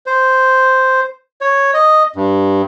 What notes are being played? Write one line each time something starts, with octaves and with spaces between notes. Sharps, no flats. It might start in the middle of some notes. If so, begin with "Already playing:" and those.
C5
C#5
D#5
G2